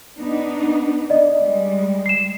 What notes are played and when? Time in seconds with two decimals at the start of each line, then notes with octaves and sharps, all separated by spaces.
0.18 B3 D4 D#4
1.10 D5 D#5
1.41 G3 G#3
2.06 C7 E7